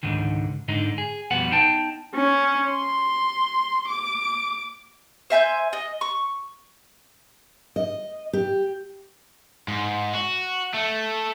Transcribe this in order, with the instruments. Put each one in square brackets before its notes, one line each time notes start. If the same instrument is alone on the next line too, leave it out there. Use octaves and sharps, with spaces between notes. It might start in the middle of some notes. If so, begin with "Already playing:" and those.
[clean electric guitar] C#2 G#2 D3 D#3
G#2 D3 D#4
G#4
F2 B2 G3 B3 F#5
B3 D#4 G5 A5
[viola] C#4
C6
D6
[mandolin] C5 E5 G#5 G6
D#5
C#6
[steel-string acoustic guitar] D#5
G4
[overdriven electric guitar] G#2
F#4
A3